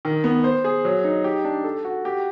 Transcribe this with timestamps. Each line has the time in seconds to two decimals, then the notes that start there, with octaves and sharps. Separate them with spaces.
0.05 D#3
0.24 B3
0.44 C5
0.64 G#4
0.85 F#3
1.04 D#4
1.24 G4
1.44 D4
1.64 A4
1.85 F#4
2.05 G4